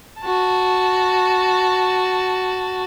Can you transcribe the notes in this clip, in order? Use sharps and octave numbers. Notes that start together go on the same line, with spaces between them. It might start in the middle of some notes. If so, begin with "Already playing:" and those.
F#4 A5